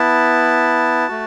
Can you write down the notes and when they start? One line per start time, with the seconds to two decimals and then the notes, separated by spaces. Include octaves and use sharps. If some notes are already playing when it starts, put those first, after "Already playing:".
Already playing: B3 E4 A5
1.08 A3 F#4